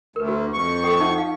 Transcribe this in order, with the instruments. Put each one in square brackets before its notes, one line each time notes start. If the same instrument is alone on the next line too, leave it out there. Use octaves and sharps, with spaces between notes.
[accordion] D2 [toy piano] A#4 B4
[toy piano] F#4
[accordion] F2 C#6
[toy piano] A4 G5 D#6
D#4 E5 F#5
F5